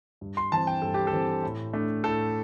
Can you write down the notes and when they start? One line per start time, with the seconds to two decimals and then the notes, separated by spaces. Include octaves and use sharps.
0.21 G2
0.37 C6
0.52 E3 C4 A5
0.67 G5
0.82 G2 A4
0.94 G4
1.07 A4
1.13 E3 C4
1.44 A2
1.73 A3 D4
2.04 A2 A4